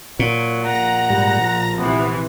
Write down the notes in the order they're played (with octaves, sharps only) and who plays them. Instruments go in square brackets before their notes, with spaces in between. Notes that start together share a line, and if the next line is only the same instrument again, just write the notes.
[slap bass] A#2 [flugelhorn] F#3
[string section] A#1 A#5 A#6 [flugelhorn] F#5
[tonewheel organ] G#2 G3
F3
[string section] A#1 C3 E3 [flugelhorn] B3